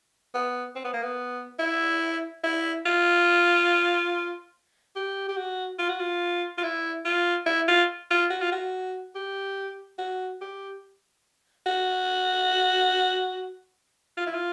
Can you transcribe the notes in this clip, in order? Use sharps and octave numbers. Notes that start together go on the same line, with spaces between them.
B3
C4
B3
A#3
B3
E4
E4
F4
G4
G4
F#4
F4
F#4
F4
F4
E4
F4
E4
F4
F4
F#4
F4
F#4
G4
F#4
G4
F#4
F4
E4
F4